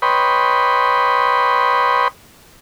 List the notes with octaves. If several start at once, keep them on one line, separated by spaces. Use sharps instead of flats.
B4 C#5 D#5 G5 B5 C6